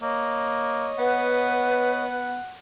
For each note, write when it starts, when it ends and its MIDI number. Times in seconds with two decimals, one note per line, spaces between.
0.02 0.89 58
0.02 2.04 73
0.02 2.04 75
0.98 2.37 59
0.98 2.28 71
0.98 2.58 78